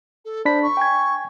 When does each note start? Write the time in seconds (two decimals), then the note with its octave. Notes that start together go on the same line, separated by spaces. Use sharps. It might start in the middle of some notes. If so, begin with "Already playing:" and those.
0.25 A4
0.45 D4 C5 B5 B6
0.62 C#6
0.77 G5 G#5 G#6